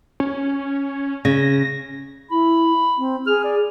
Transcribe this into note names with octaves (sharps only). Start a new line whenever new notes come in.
C#4
C#3 A#6
E4 B5
C4
G#4 F6
D5